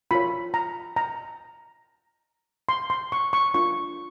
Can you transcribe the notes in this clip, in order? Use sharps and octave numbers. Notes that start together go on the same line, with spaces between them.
F4 A#4 C#5 B5
A#5
A#5
C6
C6
C#6
C#6
D4 F4 A#4 C#6